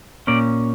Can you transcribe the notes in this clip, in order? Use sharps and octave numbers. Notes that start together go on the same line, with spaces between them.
A#2 A#3 C#4 D5